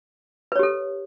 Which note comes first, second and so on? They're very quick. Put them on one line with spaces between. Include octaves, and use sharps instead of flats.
B4 C#5 G4 A4